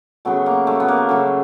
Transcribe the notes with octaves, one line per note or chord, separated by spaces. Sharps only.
C#3 F#3 A3 B3
A#3
A3
B3
A#3
C#3 F#3 A3